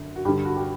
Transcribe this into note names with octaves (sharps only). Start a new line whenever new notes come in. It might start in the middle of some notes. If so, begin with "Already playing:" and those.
Already playing: F#2 D3
F#4
G2 D3 G4
F#4
G4